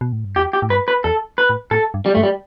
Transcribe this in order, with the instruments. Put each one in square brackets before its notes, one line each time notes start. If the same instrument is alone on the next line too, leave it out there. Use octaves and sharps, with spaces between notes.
[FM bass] B2
A2
G2
[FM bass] E2 [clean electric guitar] G4
[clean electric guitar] G4
[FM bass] A2
[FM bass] G2 [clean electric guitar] B4
[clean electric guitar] B4
[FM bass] E2 [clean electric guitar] A4
[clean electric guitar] B4
[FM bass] A2
[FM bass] A2 [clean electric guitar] A4
[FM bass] G2
[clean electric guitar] G3
[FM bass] G2 [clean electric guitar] A3
[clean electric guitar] G3